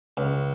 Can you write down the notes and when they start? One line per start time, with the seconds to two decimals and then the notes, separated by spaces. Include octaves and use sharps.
0.17 C#2